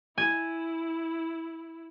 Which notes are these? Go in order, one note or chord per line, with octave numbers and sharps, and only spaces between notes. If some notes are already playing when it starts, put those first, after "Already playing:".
E4 G#5